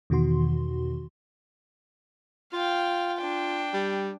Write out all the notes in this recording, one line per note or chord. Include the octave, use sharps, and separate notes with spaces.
E2 B2 D#3 F#4 C6
F4 F5 G5
D4 G5
G3